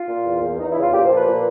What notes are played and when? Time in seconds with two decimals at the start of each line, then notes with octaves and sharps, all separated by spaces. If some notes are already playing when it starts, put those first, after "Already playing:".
Already playing: F4
0.08 A#2
0.25 E2
0.41 E2
0.59 E2 D#4
0.70 E4
0.75 C#3
0.81 F4
0.92 A#2 G4
1.04 C5
1.09 F3
1.15 B4
1.26 A#2